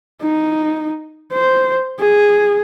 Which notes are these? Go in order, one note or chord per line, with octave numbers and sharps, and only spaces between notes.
D#4
C5
G#4